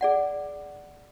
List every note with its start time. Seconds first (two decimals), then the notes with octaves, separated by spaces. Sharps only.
0.01 G#4 D5 F#5